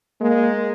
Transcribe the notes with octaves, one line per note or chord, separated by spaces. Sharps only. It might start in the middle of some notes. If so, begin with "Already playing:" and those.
G#3 A#3